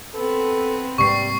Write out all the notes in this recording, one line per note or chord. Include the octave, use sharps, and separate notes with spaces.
B3 C4 A4
G#2 C3 G3 A#3 C#6 C7